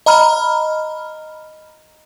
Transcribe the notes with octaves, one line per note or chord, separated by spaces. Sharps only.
D#5 A#5 B5 F6